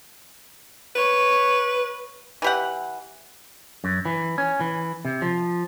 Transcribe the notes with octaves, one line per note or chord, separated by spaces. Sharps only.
B4 C#5
E3 G4 F#5
F#2
E3
C#4
E3
C3
F3